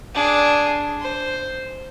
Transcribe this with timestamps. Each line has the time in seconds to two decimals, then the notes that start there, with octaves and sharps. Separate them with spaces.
0.14 D4 G#4
1.00 C5